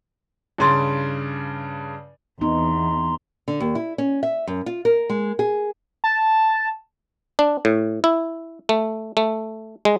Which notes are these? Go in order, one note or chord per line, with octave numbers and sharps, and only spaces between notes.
G2 C#3 E4 A#5 C6 A6
E2 B3 C4 D#4 A#5 C6
D3
D#2
E4
C#4
E5
F#2
F4
A#4
G#3
G#4
A5
D4
A2
E4
A3
A3
G#3